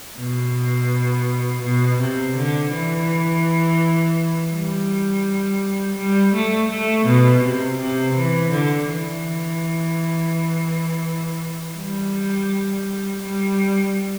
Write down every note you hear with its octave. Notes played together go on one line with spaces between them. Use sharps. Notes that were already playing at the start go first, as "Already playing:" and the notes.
B2
B2
C3
D3
E3
G3
G3
A3
A3
B2
C3
C3
E3
D3
E3
G3
G3